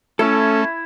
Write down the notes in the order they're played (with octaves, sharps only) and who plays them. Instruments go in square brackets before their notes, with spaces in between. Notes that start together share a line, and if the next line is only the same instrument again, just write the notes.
[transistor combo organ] A3 [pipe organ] C#4 [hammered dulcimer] E4 [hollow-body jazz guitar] A4